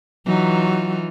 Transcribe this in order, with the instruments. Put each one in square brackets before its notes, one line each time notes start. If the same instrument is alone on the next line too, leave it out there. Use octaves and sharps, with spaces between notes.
[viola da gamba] E3 D#4 F4 [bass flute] F#3